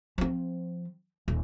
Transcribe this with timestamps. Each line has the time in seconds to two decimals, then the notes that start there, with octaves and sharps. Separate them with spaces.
0.18 F3 C4
1.28 D#1